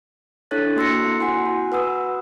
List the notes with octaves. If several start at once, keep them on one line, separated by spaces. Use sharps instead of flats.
D4 E4 A4 C#5 F#6 A6
A#3 F#4 C6 E6 A#6 C#7
C4 E4
E4 F#4 F#5 G#5 C6
F#4
B4 F#5 D#6 E6